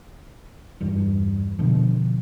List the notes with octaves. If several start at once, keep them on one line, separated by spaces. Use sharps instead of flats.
E2 G2
B2 D3 F3